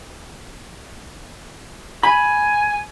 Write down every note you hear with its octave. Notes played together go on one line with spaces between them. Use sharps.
G#5 B5